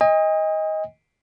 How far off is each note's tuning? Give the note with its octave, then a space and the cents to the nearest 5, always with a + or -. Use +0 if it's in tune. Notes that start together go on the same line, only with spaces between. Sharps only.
D#5 +15 G#5 -45